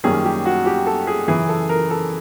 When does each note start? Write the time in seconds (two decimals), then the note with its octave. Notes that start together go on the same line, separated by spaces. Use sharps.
0.04 F#2 D#3 G3 A#3 C#4 G#4
0.25 G4
0.45 F#4
0.66 G4
0.87 A4
1.07 G#4
1.28 F#2 C#3 E3 G#4
1.49 A4
1.69 A#4
1.90 A4